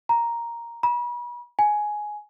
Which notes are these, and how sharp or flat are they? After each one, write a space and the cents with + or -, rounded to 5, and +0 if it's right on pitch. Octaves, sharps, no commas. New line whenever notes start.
A#5 +5
B5 -40
G#5 +10